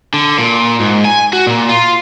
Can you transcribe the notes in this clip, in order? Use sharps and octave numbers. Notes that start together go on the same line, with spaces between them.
D3
A#2
G#2
G#5
F#4
A#2
F4